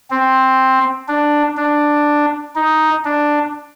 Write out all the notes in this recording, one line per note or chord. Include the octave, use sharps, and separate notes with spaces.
C4
D4
D4
D#4
D4